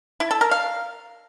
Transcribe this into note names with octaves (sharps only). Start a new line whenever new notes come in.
E4
A4
A#4
F5